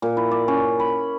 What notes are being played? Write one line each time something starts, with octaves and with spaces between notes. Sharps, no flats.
A#2
E4
D5
C#4
B5